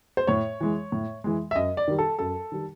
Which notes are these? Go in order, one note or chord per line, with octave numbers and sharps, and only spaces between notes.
C5
A2 C#5
E3 G#3
A2
E3 G#3
E5
F#2 D#5
D5
D#3 G3
A4
F#2 A4
D#3 G3